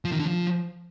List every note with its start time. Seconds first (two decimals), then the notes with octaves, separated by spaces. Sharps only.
0.05 F3
0.12 D#3
0.19 D3
0.27 F3